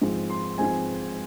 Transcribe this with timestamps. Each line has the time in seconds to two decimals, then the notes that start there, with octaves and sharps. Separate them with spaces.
0.02 G#2 F3 G#3 C4
0.30 C6
0.58 G#2 F3 G#3 C4 G#5